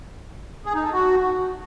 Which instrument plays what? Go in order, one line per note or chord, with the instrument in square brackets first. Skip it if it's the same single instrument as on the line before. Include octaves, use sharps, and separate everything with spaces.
[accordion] G#4
D#4
A4
F#4